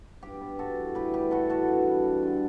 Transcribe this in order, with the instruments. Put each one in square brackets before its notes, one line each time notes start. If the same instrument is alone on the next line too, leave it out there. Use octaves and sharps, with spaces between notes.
[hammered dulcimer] G2 G4
B3
G2 F#4 A4
E3
A2 G4 B4
G3 G4 B4
A2 F#4 A4
E3 F#4 A4
G2
G3
G2
D3